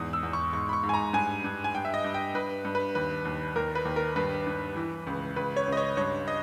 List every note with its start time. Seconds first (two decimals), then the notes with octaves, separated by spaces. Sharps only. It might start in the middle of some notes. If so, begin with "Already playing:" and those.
Already playing: E2 G#2 D#6
0.13 E6
0.23 E2
0.33 C#6
0.53 G#2 C#6
0.69 B5
0.73 C#6
0.83 G#2
0.89 G#5
0.94 A#5
1.13 G2 G#5
1.44 G2
1.64 G#5
1.75 G2 G5
1.85 E5
1.94 D#5
2.04 G2
2.14 G5
2.34 G2 B4
2.65 G2
2.75 B4
2.95 D#2 B4
3.25 D#2
3.56 D#2 A#4
3.75 B4
3.85 D#2
3.96 A#4
4.16 G2 B4
4.47 G2
4.76 E3
5.07 C#2
5.36 C#2 B4
5.56 C#5
5.67 C#2 D#5
5.77 C#5
5.97 G2 C#5
6.28 D#5